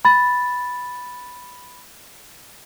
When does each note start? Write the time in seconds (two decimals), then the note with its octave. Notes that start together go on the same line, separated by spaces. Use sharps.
0.05 B5 A6